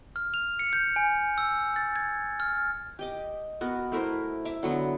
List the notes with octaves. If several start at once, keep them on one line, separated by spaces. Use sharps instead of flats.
F6
F7
C#7
G6
G#5
E6
A6
G#6
F6
G4 D#5 D6
B3 F#4 A#4
A3 E4 A#4 C5
E5 A#5 D6
D3 F#3 B3